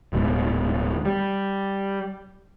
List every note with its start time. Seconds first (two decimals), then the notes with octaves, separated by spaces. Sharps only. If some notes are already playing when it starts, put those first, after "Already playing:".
0.13 D1 D2 G#2 B2
1.05 G3